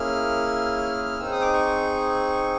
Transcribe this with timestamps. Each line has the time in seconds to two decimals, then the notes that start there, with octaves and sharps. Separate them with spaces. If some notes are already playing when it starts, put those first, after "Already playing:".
Already playing: A#3 C#4 E4 G#4 F6
1.20 C4 D#4 G#4 E6
1.32 D#6
1.42 D6
1.54 C#6